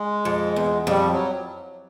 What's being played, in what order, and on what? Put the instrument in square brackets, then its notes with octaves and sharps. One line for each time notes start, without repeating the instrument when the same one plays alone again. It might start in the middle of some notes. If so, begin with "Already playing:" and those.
Already playing: [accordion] G#3
[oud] F2
E2
[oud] F2 [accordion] G3
[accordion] F#3